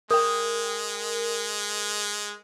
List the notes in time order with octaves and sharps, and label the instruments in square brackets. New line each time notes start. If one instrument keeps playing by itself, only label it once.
[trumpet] G#3 [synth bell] A#4 G5 [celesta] D#6